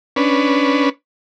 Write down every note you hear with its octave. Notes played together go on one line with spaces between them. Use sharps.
C#4 D4 B4